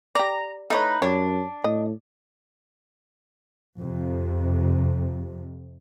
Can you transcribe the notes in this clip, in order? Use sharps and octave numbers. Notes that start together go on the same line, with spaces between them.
G4 D5 A#5
A3 D#4 E4 B4 C#5
F#2 G3 D4 C#5
A2 D#5
F2 C3